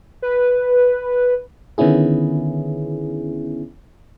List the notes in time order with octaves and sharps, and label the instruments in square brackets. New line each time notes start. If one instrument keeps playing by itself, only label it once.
[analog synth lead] B4
[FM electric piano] D3 D#3 B3 C#4 E4 G#4